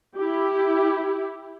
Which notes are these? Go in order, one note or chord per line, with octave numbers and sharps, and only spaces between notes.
E4 G4